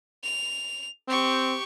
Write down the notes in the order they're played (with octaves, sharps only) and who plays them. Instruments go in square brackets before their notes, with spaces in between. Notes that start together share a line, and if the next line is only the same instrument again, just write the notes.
[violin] F7
[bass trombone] C4 [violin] G4 C#6